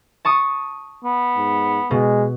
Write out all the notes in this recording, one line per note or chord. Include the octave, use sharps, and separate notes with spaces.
A5 C#6 D#6
B3
G#2
B2 G#3